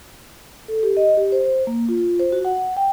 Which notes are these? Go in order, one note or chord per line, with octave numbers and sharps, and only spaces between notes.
A4
G4
D#5
G4
C5
C5
A#3
F4
C5
F#4
F#5
G5